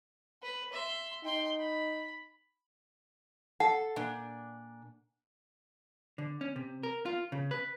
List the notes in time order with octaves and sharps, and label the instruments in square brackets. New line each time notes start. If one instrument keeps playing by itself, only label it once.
[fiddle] B4
E5 C6
[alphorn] D#4 [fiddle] G5 C6
[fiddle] B5
[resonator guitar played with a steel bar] A4 [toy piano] F#5
[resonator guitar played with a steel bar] A#2 D4
[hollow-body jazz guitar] D3
C#4
C3
A#4
F4
C#3
B4